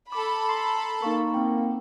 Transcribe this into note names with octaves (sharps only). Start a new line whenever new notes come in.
A4 B5 D6
A#5 C6 C7
A#3 D#4 C#6
C4 G5